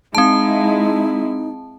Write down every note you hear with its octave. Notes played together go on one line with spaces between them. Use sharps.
G#3 C4 D#4 E4 A5